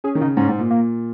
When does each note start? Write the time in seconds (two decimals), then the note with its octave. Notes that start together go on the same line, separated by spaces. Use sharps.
0.04 C#4 G#4
0.15 D#3
0.21 C#3 D#4
0.37 G#2 C#4
0.49 G#2
0.59 A#2
0.71 A#3